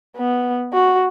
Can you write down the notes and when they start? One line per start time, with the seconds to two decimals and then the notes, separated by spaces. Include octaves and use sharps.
0.17 B3
0.73 F#4